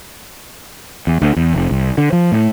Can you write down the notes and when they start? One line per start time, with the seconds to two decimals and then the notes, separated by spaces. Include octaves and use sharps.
1.07 E2
1.22 D2
1.36 E2
1.54 F1
1.71 C2
1.98 D3
2.13 F3
2.32 A2